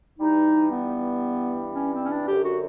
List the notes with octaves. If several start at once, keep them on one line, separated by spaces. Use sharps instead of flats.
G2 E3 G3 D#4
B3
C#4
C4
C#4
D4
F#2 D3 F#3 G4
F#4